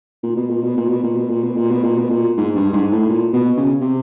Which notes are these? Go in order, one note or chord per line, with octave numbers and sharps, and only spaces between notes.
A#2
B2
A#2
B2
A#2
B2
A#2
B2
A#2
B2
A#2
B2
A#2
B2
A#2
G#2
G2
G#2
A2
A#2
B2
C#3
C3